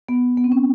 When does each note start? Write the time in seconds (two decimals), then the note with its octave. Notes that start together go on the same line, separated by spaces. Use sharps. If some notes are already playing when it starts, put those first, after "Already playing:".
0.09 B3
0.37 B3
0.44 C4
0.52 C#4